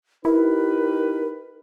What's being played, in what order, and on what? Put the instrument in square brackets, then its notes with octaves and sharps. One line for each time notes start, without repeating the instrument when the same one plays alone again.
[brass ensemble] D#4 G4 B4 [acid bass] E4 [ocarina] A#4